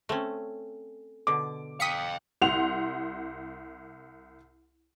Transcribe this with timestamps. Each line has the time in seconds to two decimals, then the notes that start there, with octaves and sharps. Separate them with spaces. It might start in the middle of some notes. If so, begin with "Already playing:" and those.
0.09 A3 C4 C#4
1.27 B2 D3 D6
1.80 F5 G5 D#6 B6 C#7
2.42 C2 F#5 C6 F7